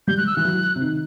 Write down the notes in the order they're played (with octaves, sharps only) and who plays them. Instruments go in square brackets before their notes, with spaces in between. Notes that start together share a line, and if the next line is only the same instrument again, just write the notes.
[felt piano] G3 [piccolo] G6
[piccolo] F#6
E6
[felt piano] E3 [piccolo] F#6
[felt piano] F#3
C3
D#3